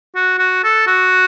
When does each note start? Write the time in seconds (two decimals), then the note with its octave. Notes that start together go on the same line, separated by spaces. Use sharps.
0.15 F#4
0.39 F#4
0.64 A4
0.87 F#4